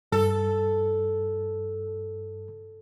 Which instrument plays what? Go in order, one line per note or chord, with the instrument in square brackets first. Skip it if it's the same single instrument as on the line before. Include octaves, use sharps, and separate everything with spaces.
[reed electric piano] G2 [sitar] A4